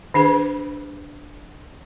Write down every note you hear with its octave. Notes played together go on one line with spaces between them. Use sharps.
D#3 D4 G#4 B4